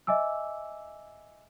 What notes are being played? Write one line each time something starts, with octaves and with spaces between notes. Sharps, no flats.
D#5 E5 G#5 D6 E6